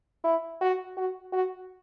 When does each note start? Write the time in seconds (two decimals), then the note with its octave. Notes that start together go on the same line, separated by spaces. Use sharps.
0.24 E4
0.61 F#4
0.97 F#4
1.33 F#4